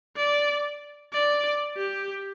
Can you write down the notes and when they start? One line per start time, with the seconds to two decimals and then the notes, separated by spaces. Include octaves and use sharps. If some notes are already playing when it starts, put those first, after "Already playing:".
0.17 D5
1.13 D5
1.77 G4